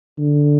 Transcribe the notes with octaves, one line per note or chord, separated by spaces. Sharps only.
D3